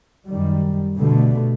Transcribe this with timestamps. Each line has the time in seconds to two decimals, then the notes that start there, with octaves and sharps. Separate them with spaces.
0.29 F#2 D#3 G3
0.98 B2 D3 G3 A3